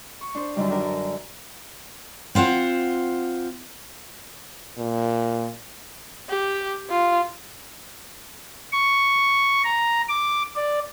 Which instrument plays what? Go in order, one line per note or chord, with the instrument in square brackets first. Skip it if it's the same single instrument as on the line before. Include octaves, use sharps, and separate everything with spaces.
[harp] C#6
D4 C5
F#2 D3 D#3 G3
D4 F#4 A#4
[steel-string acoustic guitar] C4 F4 C5 F#5
[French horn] A#2
[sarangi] G4
F4
[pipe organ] C#6
A#5
D6
D5